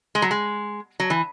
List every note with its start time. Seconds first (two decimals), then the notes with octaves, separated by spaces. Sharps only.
0.15 G#3
0.22 F#3
0.31 G#3
1.00 F#3
1.10 E3